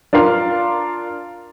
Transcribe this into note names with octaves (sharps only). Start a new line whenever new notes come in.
D4 F4 A#4 F5 C6